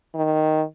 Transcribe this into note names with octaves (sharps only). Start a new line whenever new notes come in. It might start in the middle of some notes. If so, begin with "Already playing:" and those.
D#3